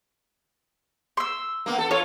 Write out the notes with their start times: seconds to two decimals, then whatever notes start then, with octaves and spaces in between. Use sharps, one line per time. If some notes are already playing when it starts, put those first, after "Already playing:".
1.17 C6 E6
1.66 A#3 B3
1.78 A4
1.91 F4 C#5